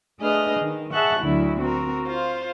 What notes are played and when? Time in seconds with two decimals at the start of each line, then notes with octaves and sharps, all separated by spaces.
0.19 A3 D4 G#4 B4 D#5 F6
0.59 D#3
0.92 G#4 E5 F#5 A5 C#6 F#6
1.21 D2 D3 F#3 E4
1.60 C4 F#4 A#4
2.07 F4 C5 F5